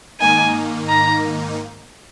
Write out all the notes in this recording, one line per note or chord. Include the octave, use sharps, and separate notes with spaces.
G#2 D#3 A#3 D#4 G#5
A#5